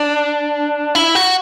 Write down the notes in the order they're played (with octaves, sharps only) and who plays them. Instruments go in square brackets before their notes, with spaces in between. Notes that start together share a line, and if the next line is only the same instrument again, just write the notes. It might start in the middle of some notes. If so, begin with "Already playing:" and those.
Already playing: [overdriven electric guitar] D4
E4
F#4